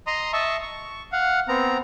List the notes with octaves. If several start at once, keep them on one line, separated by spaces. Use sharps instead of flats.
D#5 A#5 C6 D#6
D#5 E5 A5 C#6
C#6
F5 F#5
B3 C4 A#5